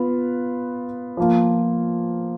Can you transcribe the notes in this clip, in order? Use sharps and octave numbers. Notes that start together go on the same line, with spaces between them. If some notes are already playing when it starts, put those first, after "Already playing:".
Already playing: B3 F4 B4 F5
F3 A#3 F4